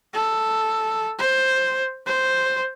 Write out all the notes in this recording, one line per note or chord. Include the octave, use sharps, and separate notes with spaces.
A4
C5
C5